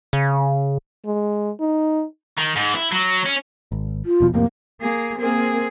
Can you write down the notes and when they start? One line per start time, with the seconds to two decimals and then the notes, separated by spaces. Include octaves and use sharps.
0.13 C#3
1.05 G#3
1.60 D#4
2.38 D#3
2.56 G#2
2.75 E4
2.92 F#3
3.26 C#4
3.72 G#1
4.06 F4
4.20 E1 B2 F3
4.34 F2 A2 C3 A#3
4.81 A#3 G#4
5.19 A#3 C4 G#4